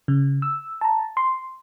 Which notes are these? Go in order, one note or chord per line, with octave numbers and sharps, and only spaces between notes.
C#3
E6
A5 A#5
C6